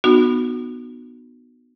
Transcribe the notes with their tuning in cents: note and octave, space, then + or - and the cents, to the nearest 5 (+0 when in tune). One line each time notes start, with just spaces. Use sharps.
B3 +0 D#4 -45 F#4 -15